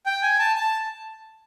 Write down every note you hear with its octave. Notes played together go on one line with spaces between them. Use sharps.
G5
G#5
A5
A5